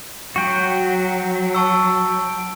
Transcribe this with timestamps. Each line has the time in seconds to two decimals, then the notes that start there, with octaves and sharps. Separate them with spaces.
0.36 F#3 F#4 G5
1.55 A5 C#6 E6